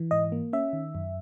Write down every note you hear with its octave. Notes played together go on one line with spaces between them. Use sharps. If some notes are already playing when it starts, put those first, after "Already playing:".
Already playing: E3
G#2 D#5
A#3
C#4 E5
D#3
F#2